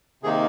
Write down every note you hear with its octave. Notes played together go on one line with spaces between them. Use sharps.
C3 D#3 A#3 D#4 G#4